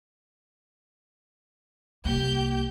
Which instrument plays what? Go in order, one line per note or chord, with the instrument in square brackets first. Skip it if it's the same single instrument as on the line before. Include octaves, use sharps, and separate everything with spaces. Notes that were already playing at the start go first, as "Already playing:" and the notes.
[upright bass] C2 A#3 [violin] G4 G6